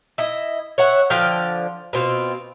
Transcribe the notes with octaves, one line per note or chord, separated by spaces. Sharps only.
E4 D#5
C#5 E5 F#5
D3 F3 F5 G5
B2 C4 F4